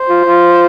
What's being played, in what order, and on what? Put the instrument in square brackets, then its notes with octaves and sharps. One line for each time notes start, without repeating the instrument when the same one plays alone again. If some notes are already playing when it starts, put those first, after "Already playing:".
Already playing: [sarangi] C5
[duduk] F4
F4